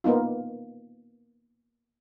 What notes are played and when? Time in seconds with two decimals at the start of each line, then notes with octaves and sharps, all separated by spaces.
0.04 A#3 B3 D#4 F4